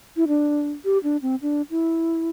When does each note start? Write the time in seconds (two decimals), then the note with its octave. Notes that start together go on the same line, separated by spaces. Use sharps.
0.17 E4
0.28 D4
0.85 G4
1.04 D4
1.22 C4
1.42 D4
1.70 E4